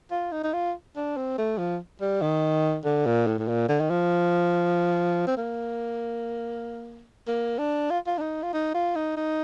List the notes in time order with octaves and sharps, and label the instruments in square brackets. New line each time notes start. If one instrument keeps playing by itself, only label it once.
[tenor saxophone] F4
D#4
D#4
F4
D4
C4
A3
F3
G3
D#3
D3
A#2
A2
A2
A#2
D3
D#3
F3
C4
A#3
A#3
D4
F4
F4
D4
D#4
F4
D#4
F4
D#4
D#4